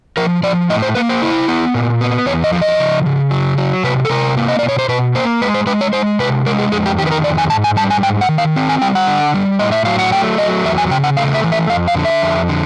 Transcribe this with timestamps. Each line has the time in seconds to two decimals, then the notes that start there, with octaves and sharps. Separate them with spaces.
0.17 F3 A#4
0.43 F3 D5
0.69 A2 D#5
0.82 C5
0.95 A#3 B4
1.09 C5
1.22 E4
1.48 B3
1.74 A#2
2.01 B3
2.26 E2 C#5
2.44 D#5
2.53 F3
2.61 D#5
2.79 C#3
3.06 C#3
3.31 F#3
3.58 F#3
3.84 C3 B4
4.05 A4
4.09 C3 A#4
4.37 A#3
4.48 D#5
4.59 B2 D5
4.68 C#5
4.79 C5
4.89 B2 B4
5.15 A#3 C5
5.42 G#3 B4
5.54 C5
5.66 G#3 B4
5.81 C#5
5.93 G#3 C5
6.19 C3 B4
6.46 G#3 A#4
6.59 G#4
6.72 F2 G#4
6.86 G4
6.98 D#3 G4
7.07 B4
7.12 A#4
7.24 F2 D5
7.38 G#5
7.50 G#2 A5
7.64 G#5
7.76 G3 A5
7.90 G#5
8.03 G#2 G5
8.21 F#5
8.29 D#3
8.38 F5
8.56 C4
8.69 G#5
8.82 G3 G5
8.95 F#5
9.07 D3
9.34 G3
9.59 A2 D#5
9.72 E5
9.85 F#3 F5
9.99 F#5
10.12 A3 G5
10.38 F#3 D#5
10.64 E2 E5
10.78 G#5
10.91 C#3 G5
11.04 F#5
11.17 A3 F5
11.34 E5
11.44 E3
11.52 E5
11.69 F2 F5
11.88 F5
11.96 D3
12.05 E5
12.22 F2
12.49 D3